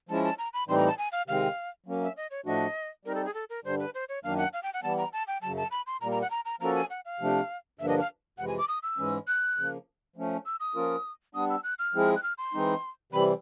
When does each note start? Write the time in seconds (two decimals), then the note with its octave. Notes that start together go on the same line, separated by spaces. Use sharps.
0.09 F3 G#3 C#4 E4 A5
0.24 A5
0.39 A#5
0.54 B5
0.68 A2 E3 G3 C4 D#4 C6
0.78 A#5
0.87 A5
0.98 G#5
1.12 F5
1.28 C3 D#3 G#3 C4 F5
1.86 F#3 A#3 C#4
2.02 E5
2.17 D#5
2.31 C#5
2.46 A2 F3 A3 D4 F#4 D#5
3.05 G3 C4 D#4 A#4
3.15 A4
3.26 G#4
3.34 A4
3.50 A#4
3.65 G2 D3 G3 C5
3.80 B4
3.94 C5
4.09 C#5
4.24 F#2 D#3 F#3 A#3 D4 F5
4.38 F#5
4.53 F5
4.63 G5
4.74 F#5
4.83 E3 G3 B3 A5
4.98 A#5
5.13 A5
5.28 G5
5.42 F#2 C#3 F#3 A5
5.57 A5
5.71 B5
5.87 C6
6.01 A#2 G3 A#3 A#5
6.12 A#5
6.22 F#5
6.31 A#5
6.45 A#5
6.60 F3 A#3 C#4 F#4 A4 A#5
6.75 G#5
6.90 F#5
7.05 F5
7.20 C3 F3 A3 D4
7.79 G2 D3 F3 A#3 D4 E5
7.89 D#5
8.00 F5
8.38 F2 C3 E3 G#3 F#5
8.48 G#5
8.58 D6
8.68 D#6
8.83 E6
8.98 G#2 E3 G#3 C#4
9.28 F#6
9.57 C#3 F3 A#3
10.16 F3 A3 C#4
10.46 E6
10.60 D#6
10.75 F3 A#3 C#4 F4 A#4
11.34 G3 B3 D4 D#6
11.50 E6
11.64 F#6
11.79 F6
11.94 F3 G#3 C4 E4 G#4
12.16 F#6
12.23 F6
12.38 C6
12.54 E3 G#3 C4 D#4
13.12 C3 E3 G3 C4 B5